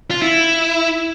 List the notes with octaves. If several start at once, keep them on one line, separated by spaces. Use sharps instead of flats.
F4
E4